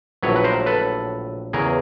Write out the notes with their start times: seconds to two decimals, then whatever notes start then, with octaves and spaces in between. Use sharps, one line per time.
0.23 A#1 A2 F#3 B4 C#5
0.36 B4
0.44 A#4 C5
0.66 A4 B4
1.53 E2 C#3 E3 G#4 A#4